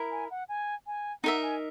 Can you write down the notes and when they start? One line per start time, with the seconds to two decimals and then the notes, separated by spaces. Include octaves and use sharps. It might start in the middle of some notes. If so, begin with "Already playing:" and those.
Already playing: E4 A#4
0.11 G#5
0.31 F#5
0.49 G#5
0.87 G#5
1.23 D#4 A#4 E5 F#5
1.42 G#5